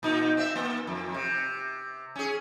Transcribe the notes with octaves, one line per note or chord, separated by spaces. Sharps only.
A#2 D#4
C4 E5
A#3
F2
C3
C#4 G#4